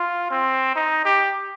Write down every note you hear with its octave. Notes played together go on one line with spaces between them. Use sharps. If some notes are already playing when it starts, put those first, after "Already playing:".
Already playing: F4
C4
D#4
G4